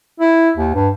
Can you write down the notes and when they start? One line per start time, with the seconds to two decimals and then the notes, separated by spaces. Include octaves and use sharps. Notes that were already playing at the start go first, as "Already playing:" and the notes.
0.20 E4
0.57 D#2
0.74 G2